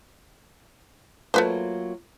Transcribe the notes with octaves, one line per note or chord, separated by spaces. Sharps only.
F#3 A3 A#3 F4 B4 C5